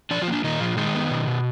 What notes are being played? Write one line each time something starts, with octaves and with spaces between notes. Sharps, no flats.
F3 D4 D5
F3 F4
A#3 D4
A#2 D#3 D#4
A#2 F3 F4
D#3 G#3 D#4
B3
B2
B2